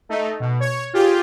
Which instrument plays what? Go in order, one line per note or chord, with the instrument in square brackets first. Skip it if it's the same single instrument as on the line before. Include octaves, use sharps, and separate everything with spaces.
[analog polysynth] A3 D#4
B2
C#5
F4 G4 G#4